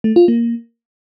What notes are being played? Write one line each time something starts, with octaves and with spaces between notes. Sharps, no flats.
A3
F4
A#3